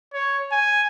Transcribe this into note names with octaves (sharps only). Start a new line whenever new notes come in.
C#5
G#5